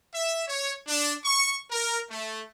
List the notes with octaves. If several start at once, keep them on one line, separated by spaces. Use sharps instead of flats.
E5
C#5
D4
C#6
A#4
A3